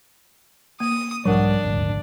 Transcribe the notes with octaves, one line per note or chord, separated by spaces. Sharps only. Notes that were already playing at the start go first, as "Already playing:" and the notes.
A#3 D#6
B1 G#2 F3 G3 D4 A#4 F#5
D#1 G#1 D2